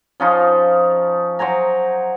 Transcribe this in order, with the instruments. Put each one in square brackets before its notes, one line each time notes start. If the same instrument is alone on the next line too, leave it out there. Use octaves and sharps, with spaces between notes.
[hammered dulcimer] F3 C#4 D#4 F4
F#3 C5 G#5 A#5